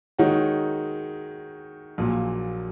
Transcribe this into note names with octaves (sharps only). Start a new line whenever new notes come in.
D#3 G#3 D#4 F#4 C#5
A#1 A#2 F#3